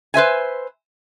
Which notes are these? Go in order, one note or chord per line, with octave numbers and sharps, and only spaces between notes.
B4 C5 E5 G#5